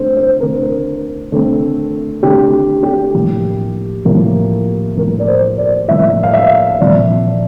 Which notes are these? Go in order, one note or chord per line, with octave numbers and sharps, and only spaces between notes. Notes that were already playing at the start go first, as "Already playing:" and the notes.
Already playing: D3 A3 C4 C5
C5
D3 A3 C4 A#4
D3 A3 C4
D3 A3 C4 G4
G4
A2 F3 A#3
A2 F3 A#3
A2 F3 A#3 A#4
D5
C5
D5
A2 F3 A#3 E5
F5
E5
A#2 F3 C4 D5